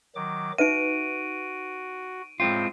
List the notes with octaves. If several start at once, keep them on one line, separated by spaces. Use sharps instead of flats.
D#3 F#3 D6
D#4 F#4 B4 E5 D7 D#7
A2 G#3 C4 F4 G5